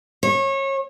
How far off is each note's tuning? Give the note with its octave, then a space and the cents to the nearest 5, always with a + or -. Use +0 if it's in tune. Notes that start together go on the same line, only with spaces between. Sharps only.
C#5 -30